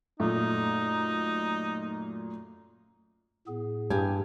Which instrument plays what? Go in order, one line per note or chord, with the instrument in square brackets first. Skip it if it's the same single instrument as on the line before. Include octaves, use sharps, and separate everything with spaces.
[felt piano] F#2 A#2 [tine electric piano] A3 [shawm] D#4
[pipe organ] A2 B3 G#4
[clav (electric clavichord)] G2 [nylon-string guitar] G4 G#5